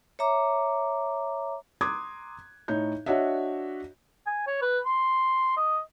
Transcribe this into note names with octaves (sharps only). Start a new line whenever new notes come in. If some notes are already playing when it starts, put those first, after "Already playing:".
C#5 E5 A#5 D6
A#5 C6 D6 D#6 F#6 G#6
A2 D#4 C#5 G6
D4 F#4 C#5 D#5 E5
G#5
C#5
B4
C6
D#5